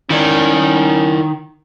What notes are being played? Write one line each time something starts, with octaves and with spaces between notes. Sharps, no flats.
D#3 C#4 E4 A#4 D5